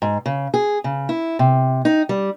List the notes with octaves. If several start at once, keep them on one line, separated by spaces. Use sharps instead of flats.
G#2
C#3
G#4
C#3
E4
C3
D#4
G3